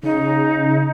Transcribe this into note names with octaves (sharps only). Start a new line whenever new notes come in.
C#3 D#4